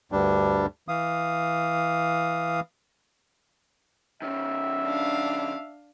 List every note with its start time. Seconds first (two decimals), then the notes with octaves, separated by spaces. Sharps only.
0.12 D2 G2 G3 D4
0.88 E3 F5 D#6
4.22 D#3 C#4 E5
4.84 D4 F5